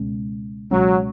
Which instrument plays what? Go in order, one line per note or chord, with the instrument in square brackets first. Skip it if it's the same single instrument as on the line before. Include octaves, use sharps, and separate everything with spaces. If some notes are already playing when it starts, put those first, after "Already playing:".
Already playing: [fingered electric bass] C#2 B2 G#3 C#4
[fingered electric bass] C#2 B2 G#3 C#4 [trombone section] F#3